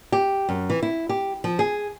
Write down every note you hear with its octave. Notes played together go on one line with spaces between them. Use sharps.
G4
F#2
E3
E4
G4
F3
G#4